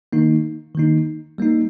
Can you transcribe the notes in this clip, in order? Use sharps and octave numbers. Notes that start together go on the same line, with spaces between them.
D#3 A#3 D#4
D#3 A#3 D#4
G3 A#3 D#4